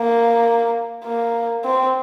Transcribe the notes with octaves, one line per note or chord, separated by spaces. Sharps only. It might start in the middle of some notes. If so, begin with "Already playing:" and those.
Already playing: A#3
A#3
C4